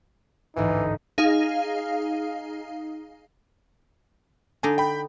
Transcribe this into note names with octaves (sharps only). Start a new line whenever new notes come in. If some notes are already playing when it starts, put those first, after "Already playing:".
A1 D2 G#2 E3 D#4
D#4 G#4 F5
D3 D4 D#4 G#5
G5 B5